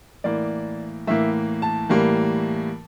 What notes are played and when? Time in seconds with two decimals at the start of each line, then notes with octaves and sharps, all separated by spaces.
0.24 A2 E3 A#3 D5
1.07 A2 E3 A#3 E5
1.62 A5
1.89 A2 E3 G3 A#3